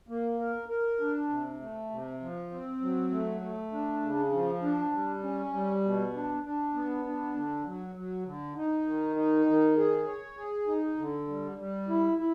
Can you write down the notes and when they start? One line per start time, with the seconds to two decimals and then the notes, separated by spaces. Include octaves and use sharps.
0.09 A#3
0.39 A#4
0.69 A#4
1.00 D4
1.29 C3
1.60 A3
1.90 C3
2.20 F3
2.51 C4
2.81 F#3
3.11 A3
3.41 A3
3.72 D4
4.02 C#3
4.32 F3
4.62 D4
4.92 G3
5.23 C#4
5.53 G3
5.83 B2
6.13 D4
6.43 D4
6.74 B3
7.04 D4
7.34 D3
7.65 F#3
7.95 F#3
8.25 D3
8.56 D#4
8.86 D#3
9.16 D#4
9.46 D#3
9.77 G#4
10.07 C#5
10.37 G#4
10.67 D#4
10.97 D3
11.28 G3
11.58 G3
11.88 E4
12.18 E4